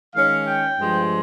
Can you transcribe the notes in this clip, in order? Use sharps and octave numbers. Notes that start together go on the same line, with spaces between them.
D#3 G#3 C#4 F5
G5
G2 F3 G#3